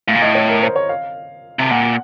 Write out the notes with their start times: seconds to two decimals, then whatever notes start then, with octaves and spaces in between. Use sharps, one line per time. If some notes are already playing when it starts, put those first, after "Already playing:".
0.07 A2 F5
0.15 A#2
0.22 A2 D#5
0.35 C#5
0.48 A#4
0.63 C5
0.76 C#5
0.89 F5
1.59 C3 A5
1.71 A#2 F#5